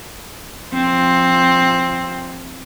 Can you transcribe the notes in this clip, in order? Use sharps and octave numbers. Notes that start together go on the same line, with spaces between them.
F3 C4